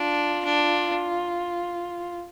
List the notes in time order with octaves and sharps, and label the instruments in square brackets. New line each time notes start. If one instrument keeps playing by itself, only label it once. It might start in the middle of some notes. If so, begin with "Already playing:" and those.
Already playing: [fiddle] D4 [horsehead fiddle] F4
[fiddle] D4